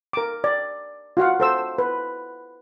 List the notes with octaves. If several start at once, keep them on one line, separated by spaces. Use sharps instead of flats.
A#4 D6
D5
F4 F#4 F5 F#5
A4 C5 E6
B4